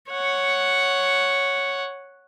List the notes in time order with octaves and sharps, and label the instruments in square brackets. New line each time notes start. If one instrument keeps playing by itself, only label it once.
[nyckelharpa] C#5 F#5